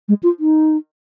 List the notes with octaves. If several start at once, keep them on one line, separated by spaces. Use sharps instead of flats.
G#3
F4
D#4